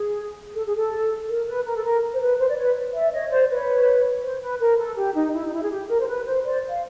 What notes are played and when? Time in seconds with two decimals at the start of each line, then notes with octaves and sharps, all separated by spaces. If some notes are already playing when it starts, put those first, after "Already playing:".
Already playing: G#4
0.54 A4
0.66 G#4
0.76 A4
1.28 A#4
1.47 B4
1.65 A#4
1.76 A4
1.84 A#4
2.13 C5
2.21 B4
2.39 C5
2.49 D5
2.57 B4 C#5
2.94 D5 E5
3.13 C#5 D#5
3.30 C5 D5
3.49 B4 C#5
4.23 C5
4.42 B4
4.61 A#4
4.78 A4
4.96 G4
5.15 D#4
5.33 E4
5.46 D#4
5.52 E4
5.63 G#4
5.70 G4
5.89 A#4
6.00 C5
6.08 B4
6.26 C5
6.45 C5 D5
6.69 F5